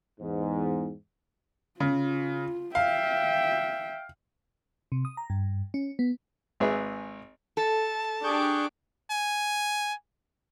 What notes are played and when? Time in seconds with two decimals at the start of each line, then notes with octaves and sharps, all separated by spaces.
0.21 E2 G#2
1.80 C#3 F4
2.75 E5 F5 G5
4.92 C3
5.05 D#6
5.17 A#5
5.30 G2
5.74 C#4
5.99 B3
6.60 G#1 G#4 B4 E5
7.57 A4 A5
8.24 D4 G4 G#4 C#6 D6 G6
9.10 G#5